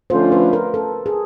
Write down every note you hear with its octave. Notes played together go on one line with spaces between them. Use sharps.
D3 F3 A3 C#4 F4 C5
B4
A#4
A4
G#4